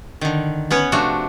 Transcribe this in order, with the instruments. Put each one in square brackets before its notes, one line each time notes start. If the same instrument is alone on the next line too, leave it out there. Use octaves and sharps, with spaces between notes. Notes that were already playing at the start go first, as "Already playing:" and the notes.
[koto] D3 D#3
B3 C#4 B4 C#5
C3 F3 A3 D4 F#4